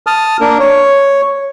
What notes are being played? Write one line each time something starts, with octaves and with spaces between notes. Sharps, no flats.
A5 D#6 F6
A#3 D4 A#4
C#5